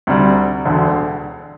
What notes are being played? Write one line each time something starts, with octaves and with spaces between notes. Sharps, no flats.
D2 C3 G3
E1 D2 D3